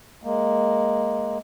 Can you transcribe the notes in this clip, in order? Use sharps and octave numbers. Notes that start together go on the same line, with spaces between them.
G#3 A#3